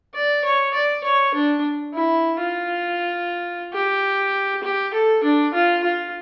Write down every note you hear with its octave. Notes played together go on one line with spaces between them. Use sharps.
D5
C#5
D5
C#5
D4
E4
F4
G4
G4
A4
D4
F4
F4